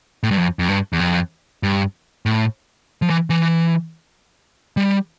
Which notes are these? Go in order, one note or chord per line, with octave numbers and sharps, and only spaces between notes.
A2
G2
F2
F2
G2
E2
F2
G2
A2
F3
E3
E3
G3